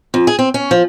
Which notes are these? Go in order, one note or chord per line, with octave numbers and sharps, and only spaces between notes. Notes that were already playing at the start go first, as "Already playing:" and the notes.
F2
G#4
C4
C#4
F3